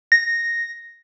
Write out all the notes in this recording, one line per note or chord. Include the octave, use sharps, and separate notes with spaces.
A#6